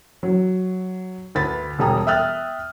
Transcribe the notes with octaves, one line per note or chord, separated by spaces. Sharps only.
F#3
D2 B4 B5 A6
E1 G3 G#4 A5 A#5 D#6
E5 G5 D#6 F6 F#6 A6